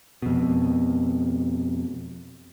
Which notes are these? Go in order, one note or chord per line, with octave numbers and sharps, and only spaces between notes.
F2 B2